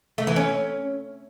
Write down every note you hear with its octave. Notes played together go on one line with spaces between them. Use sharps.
A3
E3
C#4